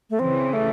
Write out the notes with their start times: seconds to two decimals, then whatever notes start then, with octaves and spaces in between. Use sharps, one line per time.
0.10 A3
0.18 C#3 E3 C4
0.53 A3